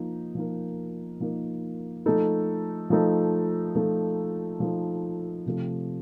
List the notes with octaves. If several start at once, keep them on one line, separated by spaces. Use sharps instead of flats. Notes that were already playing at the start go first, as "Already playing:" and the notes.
Already playing: F3 A#3 D#4
F3 A#3 D#4 A#4
F3 A#3 D#4 A#4
F3 A3 D#4 A4
F3 A3 D#4 A4
F3 A3 D#4 A4
F3 A3 D#4 A4
C3 F3 A3